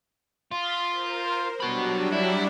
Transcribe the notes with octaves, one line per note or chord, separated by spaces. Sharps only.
F4 D#6 A6 B6
A#4 C5
F#3 G3 D4 F#4 B5
E4